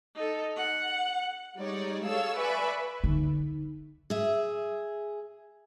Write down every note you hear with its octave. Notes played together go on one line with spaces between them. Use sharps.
D#4 A4
F#5
G3 G#3 D#4 C#5 D5
G#4 A4 C#5 F5 E6
B4 D5 E5 G#5 B5 C#6
D3 D#4
G#4 E5